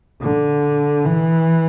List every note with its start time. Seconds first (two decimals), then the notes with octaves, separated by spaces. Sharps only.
0.21 D3
1.04 E3